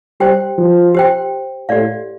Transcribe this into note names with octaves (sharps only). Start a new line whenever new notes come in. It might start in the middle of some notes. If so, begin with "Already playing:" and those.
G3 G4 C5 G5
F3
G4 C5 G5
A2 G4 D5 F5